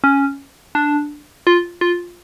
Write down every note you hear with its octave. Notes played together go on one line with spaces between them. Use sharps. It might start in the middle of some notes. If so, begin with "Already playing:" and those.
C#4
D4
F4
F4